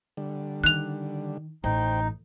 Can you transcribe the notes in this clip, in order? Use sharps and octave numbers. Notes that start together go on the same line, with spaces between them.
D3 G3
D#3 F#6 F7
A1 D#4 C5 G5